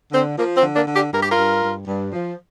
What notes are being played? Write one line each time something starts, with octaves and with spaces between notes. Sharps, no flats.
D3 C4
F3 A#3
C4
D3
A#3 D4
D3
D4 G4
G2 A#4
G4
F4 A#4
G2
G2
G2
F3